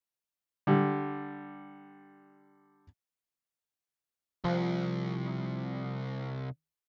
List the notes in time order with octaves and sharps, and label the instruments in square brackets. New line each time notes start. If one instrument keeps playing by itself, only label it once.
[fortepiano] D3 G3
[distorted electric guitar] C2 [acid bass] F3